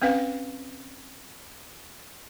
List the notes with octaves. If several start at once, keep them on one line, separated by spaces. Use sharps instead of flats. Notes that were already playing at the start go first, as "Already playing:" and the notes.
C4 C#4 B4 F5